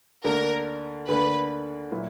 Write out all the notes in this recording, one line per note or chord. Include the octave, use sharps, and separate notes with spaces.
D2 D3 A#3 D4 A#4
D2 D3 A#3 D4 B4
A#2 F#3 A#3 E4 B4